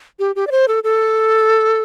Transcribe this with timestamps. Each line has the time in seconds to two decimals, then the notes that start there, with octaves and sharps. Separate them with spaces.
0.19 G4
0.36 G4
0.47 D5
0.51 C5
0.68 A4
0.84 A4